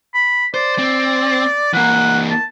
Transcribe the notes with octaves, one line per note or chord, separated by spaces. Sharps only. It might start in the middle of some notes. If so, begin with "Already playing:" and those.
B5
C5 D5
C4
E3 A#3 F#5
A5